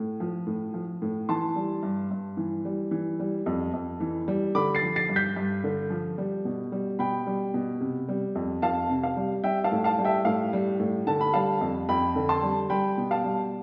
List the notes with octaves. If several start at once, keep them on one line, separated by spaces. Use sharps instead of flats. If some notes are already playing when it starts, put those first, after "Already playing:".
Already playing: A2
F3
A2
F3
A2
E3 A5 C6
G3
G2
G2
E3
G3
E3
G3
F2
F2
E3
G3
D3 B5 D6
A6 C7
F3
A6 C7
G2
G6 B6
G2
D3
F3
G3
B2
G3
B2 G5 B5
G3
B2
C3
G3
F2
F2 F5 A5
C3
F5
G3
G3 E5 G5
F5 A5
A2
F5 A5
G3
E5 G5
A2 F5
G3
A2
D3 A5
B5
G3 F5 A5
F2
F2 G5 B5
D3
A5 C6
G3
G3 G5 B5
B2
F5 A5
G3